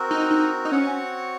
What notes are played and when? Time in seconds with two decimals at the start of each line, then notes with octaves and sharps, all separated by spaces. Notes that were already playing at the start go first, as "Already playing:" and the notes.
Already playing: C4 F#4 A#4
0.11 D#4
0.31 D#4
0.65 D#4
0.71 C4 C#4 F#4 C#5 F#5